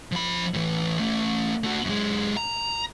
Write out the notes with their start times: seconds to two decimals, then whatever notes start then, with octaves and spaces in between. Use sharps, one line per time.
0.12 F3 B5
0.54 A2 E3
0.99 A3 C#4
1.64 A3 F#4
1.84 F#2 G#3
2.37 A#5